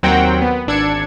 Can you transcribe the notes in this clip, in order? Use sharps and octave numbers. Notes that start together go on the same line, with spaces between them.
D#2 F#3 C4 A#4 F#5 G5
B3
G#1 D4 E6 G#6 C#7